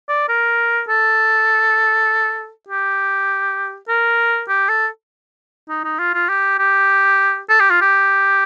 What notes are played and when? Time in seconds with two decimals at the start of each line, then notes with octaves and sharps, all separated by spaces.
0.09 D5
0.29 A#4
0.89 A4
2.69 G4
3.89 A#4
4.49 G4
4.69 A4
5.69 D#4
5.84 D#4
5.99 F4
6.14 F4
6.29 G4
6.59 G4
7.49 A4
7.60 G4
7.71 F4
7.82 G4